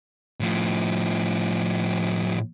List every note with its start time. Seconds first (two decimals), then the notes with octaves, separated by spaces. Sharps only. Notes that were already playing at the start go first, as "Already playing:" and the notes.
0.40 A2 F3